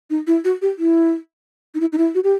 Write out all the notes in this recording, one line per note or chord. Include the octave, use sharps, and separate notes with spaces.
D#4
E4
F#4
G4
E4
D#4
E4
D#4
E4
F#4
G4